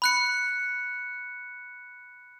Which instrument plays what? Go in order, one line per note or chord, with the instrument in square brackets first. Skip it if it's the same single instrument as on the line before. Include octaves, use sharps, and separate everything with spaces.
[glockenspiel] B5 F#6 C#7